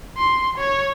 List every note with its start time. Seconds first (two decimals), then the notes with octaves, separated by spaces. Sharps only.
0.17 C6
0.58 C#5